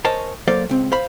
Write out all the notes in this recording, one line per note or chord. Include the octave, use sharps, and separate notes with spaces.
A#4 C5 C#5 D#5 G#5 A5
F#3 A#3 A4 C5 D5 F5
C#2 C4
C5 F5 B5